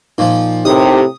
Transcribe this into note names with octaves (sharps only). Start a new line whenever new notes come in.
A#2 F3 D#4
A2 C3 D#4 G4 A4 A#4 D#6